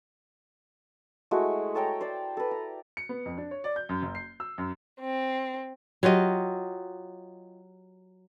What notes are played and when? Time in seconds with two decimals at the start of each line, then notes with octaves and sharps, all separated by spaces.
1.31 G#3 A3 E4 F#4
1.75 A4 C#5 G5 A#5
2.01 C5 D5
2.37 A4 B4
2.51 A#5
2.97 C#7
3.09 B3
3.26 F2
3.38 D4
3.51 C#5
3.64 D5
3.76 G6
3.89 F#2
4.02 F#1
4.15 C7
4.40 E6
4.58 F#2
4.99 C4
6.03 F#3 F4 G4 D#5